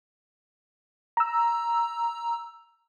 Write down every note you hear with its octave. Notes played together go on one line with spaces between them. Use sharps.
A#5 E6